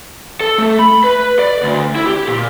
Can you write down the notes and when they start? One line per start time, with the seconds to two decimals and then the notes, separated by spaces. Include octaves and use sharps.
0.41 A4
0.58 A3
0.79 B5
1.04 B4
1.39 D5
1.63 D2
1.95 E4
2.07 G4
2.27 A#2